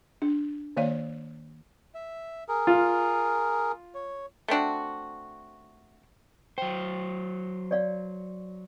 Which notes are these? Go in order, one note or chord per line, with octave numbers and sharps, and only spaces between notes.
D4
D#3 A#3 C#5 D5 F5
E5
G#4 A#4
F4
C#5
A3 C4 D4 F#4
F#3 C5 G5
C#5 D5 F5